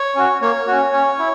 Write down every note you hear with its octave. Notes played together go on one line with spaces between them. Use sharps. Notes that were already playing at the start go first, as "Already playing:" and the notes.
Already playing: C#5
C#4 F#4
A#3 C#5
C#4 F#4
C#4
E4